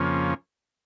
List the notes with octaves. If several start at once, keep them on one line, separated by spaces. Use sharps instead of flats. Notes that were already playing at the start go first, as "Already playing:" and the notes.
Already playing: F2 C#3 F3 A#3 C#4